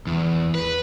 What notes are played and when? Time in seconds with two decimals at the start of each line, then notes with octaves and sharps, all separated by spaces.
0.07 E2
0.55 B4